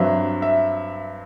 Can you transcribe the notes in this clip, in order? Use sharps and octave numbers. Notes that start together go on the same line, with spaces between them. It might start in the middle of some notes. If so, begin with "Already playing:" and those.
Already playing: G2 F#3 C4 E5
E5